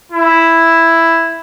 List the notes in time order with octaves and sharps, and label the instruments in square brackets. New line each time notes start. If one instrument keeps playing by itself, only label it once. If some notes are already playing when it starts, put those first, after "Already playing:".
[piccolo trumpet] E4